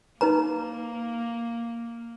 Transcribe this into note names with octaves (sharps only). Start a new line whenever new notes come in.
A#3 D#4 B4 A#5